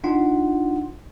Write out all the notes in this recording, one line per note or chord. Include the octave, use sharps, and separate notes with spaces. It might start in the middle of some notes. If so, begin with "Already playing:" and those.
D4 D#4 F4 F#5 C6